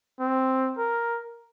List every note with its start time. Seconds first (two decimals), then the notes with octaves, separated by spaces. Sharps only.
0.19 C4
0.78 A#4